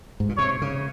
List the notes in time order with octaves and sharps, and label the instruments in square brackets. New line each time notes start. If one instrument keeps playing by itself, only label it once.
[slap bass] G#2
A#2
[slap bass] C3 [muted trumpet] C#5
[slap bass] C#3